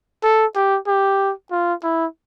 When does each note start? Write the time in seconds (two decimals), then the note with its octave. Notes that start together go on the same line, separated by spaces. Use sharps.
0.23 A4
0.55 G4
0.87 G4
1.51 F4
1.83 E4